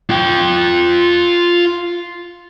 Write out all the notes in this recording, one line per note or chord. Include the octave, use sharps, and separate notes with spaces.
F4 G5